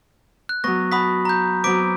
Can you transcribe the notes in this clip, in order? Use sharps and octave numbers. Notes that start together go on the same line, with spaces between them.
F#6
F#3 B3 C#6 A#6
F#5 A5 B5 D#6 B6
A#5 G6
F#3 B3 C4 D6 B6 D7